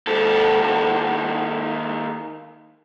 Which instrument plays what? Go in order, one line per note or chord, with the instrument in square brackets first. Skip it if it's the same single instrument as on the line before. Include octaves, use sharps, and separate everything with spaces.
[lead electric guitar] D#2 A4